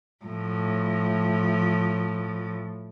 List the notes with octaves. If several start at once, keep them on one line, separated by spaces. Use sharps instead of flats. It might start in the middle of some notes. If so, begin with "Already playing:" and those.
A2 F3